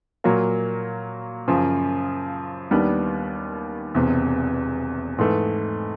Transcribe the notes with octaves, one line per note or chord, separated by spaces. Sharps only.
A#2 F#3 A#3
F#2 C#3 F3
D#2 D#3 G3 B3 D4
E1 E2 C3
G#2 E3 A3